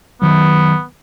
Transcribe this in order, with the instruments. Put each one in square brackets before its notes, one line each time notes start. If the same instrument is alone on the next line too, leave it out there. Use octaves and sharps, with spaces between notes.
[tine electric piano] D#3 F#3 [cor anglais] B3